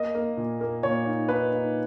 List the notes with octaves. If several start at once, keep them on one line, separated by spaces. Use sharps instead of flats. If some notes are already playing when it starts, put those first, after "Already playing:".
Already playing: A#3 D#5
A#3
A#2
A#3
A#2 C#5
D#4
D#4 B4
D#4